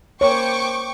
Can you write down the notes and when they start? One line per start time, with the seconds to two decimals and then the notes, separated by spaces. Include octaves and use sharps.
0.21 A#3 C5 C#5 G5 C#6 D6